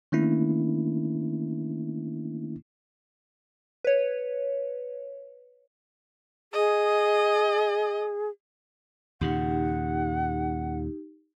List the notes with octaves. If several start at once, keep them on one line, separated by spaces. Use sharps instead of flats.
D#3 A3 A#3 C#4 D4 E4
B4 C#5
G#4 D#5
D#2 A#2 C#3 D#4 G4 F#5